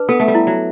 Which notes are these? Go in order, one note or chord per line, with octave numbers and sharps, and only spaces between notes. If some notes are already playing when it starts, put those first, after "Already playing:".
Already playing: D4 B4
B3 A4
A3
G3
E4
F#3